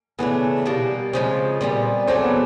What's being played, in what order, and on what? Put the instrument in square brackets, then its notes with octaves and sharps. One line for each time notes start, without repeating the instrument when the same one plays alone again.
[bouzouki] C#3 E3 A3 D4 [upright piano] B3
[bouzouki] B2 G3 A#3
[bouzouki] C#3 F3 G#3 [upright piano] C4
[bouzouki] A#2 G3 B3
[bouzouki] C#3 F#3 A3 D4 [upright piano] C4
[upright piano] B3